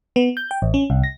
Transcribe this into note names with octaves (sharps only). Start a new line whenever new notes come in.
B3
G6
G5
A1
C#4
C2
A#6